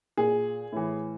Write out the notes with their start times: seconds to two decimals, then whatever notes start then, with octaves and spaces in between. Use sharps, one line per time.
0.17 A#2 G#4
0.72 A2 E3